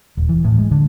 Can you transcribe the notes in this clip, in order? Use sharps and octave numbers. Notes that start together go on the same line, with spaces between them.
D#1
E3
A2
G#3
D3